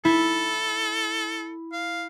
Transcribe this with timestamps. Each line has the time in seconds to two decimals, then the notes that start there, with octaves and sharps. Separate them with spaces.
0.05 E4 A4
1.73 F5